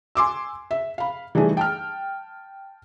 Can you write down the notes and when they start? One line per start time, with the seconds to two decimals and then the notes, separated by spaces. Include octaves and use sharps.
0.15 G#5 C6 D6 E6
0.71 E5
0.98 F5 B5
1.35 E3 G3 A3 D4 D#4 G#4
1.57 G5 A5 F6